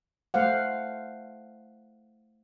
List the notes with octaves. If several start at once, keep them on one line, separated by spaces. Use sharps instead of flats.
A3 C5 F5 F#5